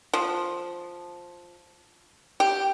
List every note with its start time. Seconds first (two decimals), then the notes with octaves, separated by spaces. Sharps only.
0.13 F3
2.40 G4